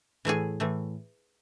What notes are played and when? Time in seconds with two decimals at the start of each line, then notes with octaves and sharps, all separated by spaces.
0.25 A2 E3 A3 G#4
0.60 A2 E3 A3